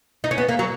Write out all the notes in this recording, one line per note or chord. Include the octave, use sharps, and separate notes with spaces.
D#4
C#4
B3
A#3
F#3